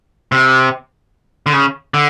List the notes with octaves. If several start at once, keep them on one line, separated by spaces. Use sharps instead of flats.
C3
D3
C#3
D3